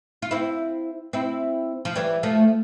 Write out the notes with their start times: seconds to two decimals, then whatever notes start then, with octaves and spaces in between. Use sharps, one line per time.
0.22 F4
0.31 C4 E4
1.13 C4 E4
1.85 F3
1.96 E3 G3
2.23 F3 A3